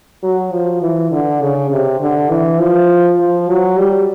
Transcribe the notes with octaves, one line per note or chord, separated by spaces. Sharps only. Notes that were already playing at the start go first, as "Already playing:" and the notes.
F#3
F3
E3
D3
C#3
C3
D3
E3
F3
F3
F#3
G3